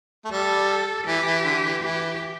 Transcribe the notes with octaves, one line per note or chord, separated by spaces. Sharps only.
A3
G3 A4
E3 G4
E3
D3
E3
E3 G4